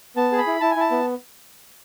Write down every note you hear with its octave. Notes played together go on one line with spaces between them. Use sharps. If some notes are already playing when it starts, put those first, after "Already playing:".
B3 A5
G#4
B5
E4
E4 A5
G#5
E4 A5
B3